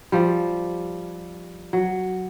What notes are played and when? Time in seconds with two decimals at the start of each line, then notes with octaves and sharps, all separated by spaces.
0.12 F3 G3
1.73 F#3